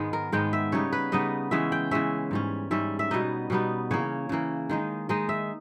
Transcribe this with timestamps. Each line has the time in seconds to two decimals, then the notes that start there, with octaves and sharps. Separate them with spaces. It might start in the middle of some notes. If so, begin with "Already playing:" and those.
Already playing: G#2 D#3 G#3 B3
0.13 A#4
0.32 G#2 D#3 G#3 B3 G5
0.53 E5
0.72 C#3 G3 B3 D#4 C#5
0.93 B4
1.12 C#3 G3 B3 D#4 D#5
1.51 C#3 E3 G#3 C#4 E5
1.72 G5
1.91 C#3 E3 G#3 C#4 E5
2.31 G#2 G3 C#4
2.71 G#2 G3 C#4 E5
2.99 E5
3.11 B2 G3 B3 D#4 D#5
3.50 B2 G3 B3 D#4
3.91 C#3 E3 A#3 C#5
4.29 C#3 E3 A#3
4.70 D#3 G#3 D#4
5.09 D#3 G#3 D#4 D#5
5.29 E5